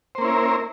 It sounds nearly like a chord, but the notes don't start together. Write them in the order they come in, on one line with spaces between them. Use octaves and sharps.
C5 A#3 C#4 E4 A#4